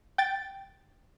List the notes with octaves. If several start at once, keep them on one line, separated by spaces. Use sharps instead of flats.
G5 A6